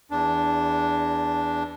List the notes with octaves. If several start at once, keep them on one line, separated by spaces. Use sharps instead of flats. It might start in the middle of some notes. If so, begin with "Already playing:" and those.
E2 D4